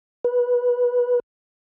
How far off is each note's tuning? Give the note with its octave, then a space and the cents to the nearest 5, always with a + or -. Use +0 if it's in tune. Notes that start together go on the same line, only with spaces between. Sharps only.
B4 -15